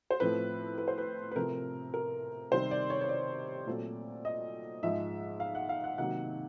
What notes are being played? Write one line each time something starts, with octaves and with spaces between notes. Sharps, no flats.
C5
A2 F3 A3 C4 B4
B4
C5
B4
B4
C3 F3 A3 C4 A#4
A#4
C3 D#3 G3 C5
D5
C#5
C#5
D5
A#2 F#3 A3 C4
D#5
G#2 F3 G#3 E5
F5
F#5
F5
F#5
C3 D#3 F#3 A#3 F#5